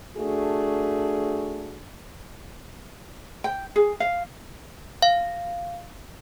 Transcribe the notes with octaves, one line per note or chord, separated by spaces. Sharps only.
A3 D4 F#4 G#4
G5
G#4
F5
F5